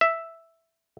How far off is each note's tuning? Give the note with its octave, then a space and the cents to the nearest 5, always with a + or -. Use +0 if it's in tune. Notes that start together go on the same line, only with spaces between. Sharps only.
E5 +0